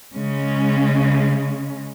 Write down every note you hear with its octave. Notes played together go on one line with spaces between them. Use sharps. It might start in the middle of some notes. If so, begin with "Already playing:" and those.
C#3 G#3 C#4